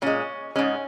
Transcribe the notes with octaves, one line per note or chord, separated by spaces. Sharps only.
A#2 G#3 C#4
G#2 G#3 C#4